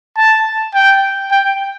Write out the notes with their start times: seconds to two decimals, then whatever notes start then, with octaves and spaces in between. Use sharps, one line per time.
0.17 A5
0.75 G5
1.31 G5